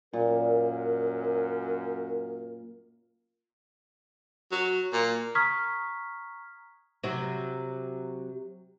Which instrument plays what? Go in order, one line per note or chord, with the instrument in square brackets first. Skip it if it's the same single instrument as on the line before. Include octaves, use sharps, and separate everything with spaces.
[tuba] F#2 [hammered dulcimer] A#2 [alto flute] A#4
[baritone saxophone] F#3
A#2
[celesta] A#5 C#6 D#6 F6 G#6 B6
[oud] C3 F#3 F#4